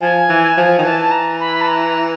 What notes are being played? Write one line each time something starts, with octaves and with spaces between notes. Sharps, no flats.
F3 G#5
E3
F3
D#3
E3 A5
A#5
B5
A5
A#5